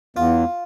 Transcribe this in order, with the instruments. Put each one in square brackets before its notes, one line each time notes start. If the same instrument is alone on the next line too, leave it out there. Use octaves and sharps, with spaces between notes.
[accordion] E2 [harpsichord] F4